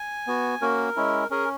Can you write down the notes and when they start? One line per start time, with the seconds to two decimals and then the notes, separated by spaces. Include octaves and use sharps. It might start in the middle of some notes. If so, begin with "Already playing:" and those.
Already playing: G#5
0.27 B3 F#4
0.62 A#3 C#4 F#4 A#4
0.96 G#3 C#4 E4
1.31 C#4 G#4 A#4